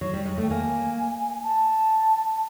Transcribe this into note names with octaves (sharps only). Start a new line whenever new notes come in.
F#3
G3
G#3
A3
G5
A#3 G#5
A5